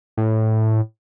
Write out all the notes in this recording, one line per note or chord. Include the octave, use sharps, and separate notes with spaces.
A2